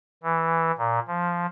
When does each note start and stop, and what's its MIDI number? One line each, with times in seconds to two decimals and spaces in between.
0.23 0.71 52
0.78 1.00 46
1.08 1.47 53